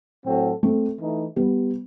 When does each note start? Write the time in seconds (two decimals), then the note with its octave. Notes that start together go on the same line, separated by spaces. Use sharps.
0.26 A2 F#3 C4 F#4 A4
0.63 A3 C4
1.00 E3 A3 D#4
1.36 G3 B3